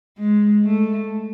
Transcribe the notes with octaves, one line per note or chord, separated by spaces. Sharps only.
G#3
A3